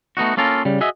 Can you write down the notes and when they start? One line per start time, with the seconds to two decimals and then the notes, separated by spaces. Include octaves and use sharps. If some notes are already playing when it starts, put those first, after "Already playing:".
0.17 A3 B3 D#4 F#4
0.37 A#3 C#4 F4 A4 A#4
0.65 C#3 G3
0.81 F#4 G#4 D#5 E5